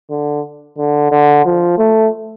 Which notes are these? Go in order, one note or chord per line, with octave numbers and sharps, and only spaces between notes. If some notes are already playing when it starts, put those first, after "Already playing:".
D3
D3
D3
F3
A3